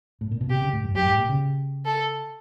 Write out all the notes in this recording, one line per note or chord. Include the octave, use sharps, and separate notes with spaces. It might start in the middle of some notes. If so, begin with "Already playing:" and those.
A2
A#2
B2
C3 G4
C#3
A2
G2
F#2 G4
G#2
A#2
C#3
A4